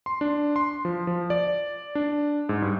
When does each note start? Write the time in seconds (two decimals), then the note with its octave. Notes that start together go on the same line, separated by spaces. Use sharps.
0.06 C6
0.21 D4
0.56 C6
0.85 F3
1.07 F3
1.30 D5
1.95 D4
2.49 G#2
2.62 G2